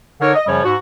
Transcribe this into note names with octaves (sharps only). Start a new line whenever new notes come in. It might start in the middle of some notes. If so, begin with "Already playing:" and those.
D3 D#4 A#4 C#5
D#5
F#2 C#3 F3 G3 C#5
G#2 F#4